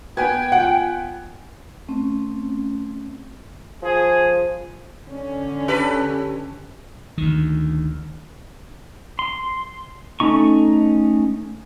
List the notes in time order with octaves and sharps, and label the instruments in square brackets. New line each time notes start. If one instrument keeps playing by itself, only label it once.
[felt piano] B3 G#5 G#6 [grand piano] B4 [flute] G5
[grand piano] F4 F#5
[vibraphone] A3 C4 C#4
[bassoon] F3 [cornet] G#4
[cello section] D3 C#4
[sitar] G4 A4 B4
[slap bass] D2 D#3
[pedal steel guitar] C6
A3 C#4 D#4 C#6